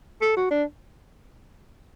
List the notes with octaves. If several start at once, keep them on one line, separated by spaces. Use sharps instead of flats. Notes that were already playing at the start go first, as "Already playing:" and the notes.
A4
F#4
D4